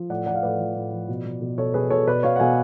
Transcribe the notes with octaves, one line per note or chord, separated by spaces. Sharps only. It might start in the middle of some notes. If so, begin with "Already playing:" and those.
Already playing: F3
A2 D5 F#5
F3 D5 F#5
F5
A2 B4 D5
F3
A2
F3
B2
B2
B2
B2 A4 C#5
B2 G#4 B4
B2 A4 C#5
B2 B4 D5
B2 C#5 F5
F#5
B2 F5 G#5